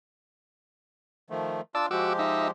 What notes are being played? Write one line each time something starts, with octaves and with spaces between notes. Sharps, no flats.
D#3 F3 A3
D4 F4 D5 A5 E6
F3 G#3 F#4 G4 D6 E6
D#4 E5